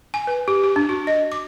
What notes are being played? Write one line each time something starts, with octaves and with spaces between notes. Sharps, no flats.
G#5
B4
G4
G4
D4
F#4
D#5
D6